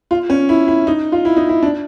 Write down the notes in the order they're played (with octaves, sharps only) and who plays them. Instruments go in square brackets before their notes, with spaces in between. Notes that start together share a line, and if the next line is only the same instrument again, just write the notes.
[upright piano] F4
C#4
E4
E4
D#4
F4
E4
D#4
E4
D4